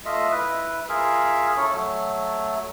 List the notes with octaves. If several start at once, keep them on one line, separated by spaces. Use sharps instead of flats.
A3 F4 D#5 E5
E4 B4
F4 G#4 A#4 E5
C#4 E4 A4 C#5
F#3 A3